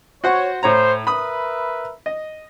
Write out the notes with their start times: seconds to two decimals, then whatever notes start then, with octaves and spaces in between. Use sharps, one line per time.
0.24 F#4 C5 C#5 F#5
0.63 A2 C5 C#5 A#5
1.07 A#4 B4 E5 B5 D#6
2.06 D#5